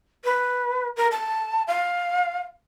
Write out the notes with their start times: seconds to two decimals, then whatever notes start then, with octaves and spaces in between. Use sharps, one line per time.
0.24 B4
0.96 A#4
1.11 A5
1.67 F5